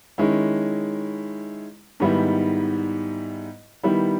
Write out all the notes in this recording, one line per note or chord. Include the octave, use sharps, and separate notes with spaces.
D#3 G#3 C#4 E4
G#2 D#3 G3 B3 E4
D#3 G3 B3 E4